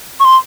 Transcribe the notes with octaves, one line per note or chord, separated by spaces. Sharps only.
C#6
C6